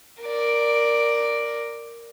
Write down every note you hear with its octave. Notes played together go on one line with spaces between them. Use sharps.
A#4 D5